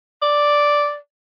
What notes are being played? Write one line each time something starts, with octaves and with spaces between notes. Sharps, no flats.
D5